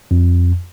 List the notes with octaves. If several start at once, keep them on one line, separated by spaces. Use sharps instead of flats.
F2